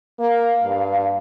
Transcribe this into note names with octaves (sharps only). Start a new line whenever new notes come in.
A#3 F5
G2